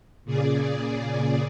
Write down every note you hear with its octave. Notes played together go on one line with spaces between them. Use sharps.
A#2 C#3 G#4 D5